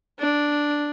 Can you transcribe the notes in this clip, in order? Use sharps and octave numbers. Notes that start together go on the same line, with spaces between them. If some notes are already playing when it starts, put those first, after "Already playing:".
D4